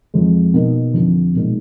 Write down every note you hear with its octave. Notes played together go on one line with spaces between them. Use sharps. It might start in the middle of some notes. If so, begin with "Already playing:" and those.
F2 F3 G#3
B2 A#3 D#4
F2 D3 F3
B1 A#2 G#3 D#4